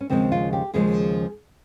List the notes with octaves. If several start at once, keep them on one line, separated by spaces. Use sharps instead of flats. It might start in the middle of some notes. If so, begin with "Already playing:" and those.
C#4
D#2 C#3 F3 G#3 C4
F4
G4
D#2 C#3 F3 G#3 G#4